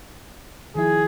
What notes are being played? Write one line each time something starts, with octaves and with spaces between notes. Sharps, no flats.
D#3 F3 E4 G#4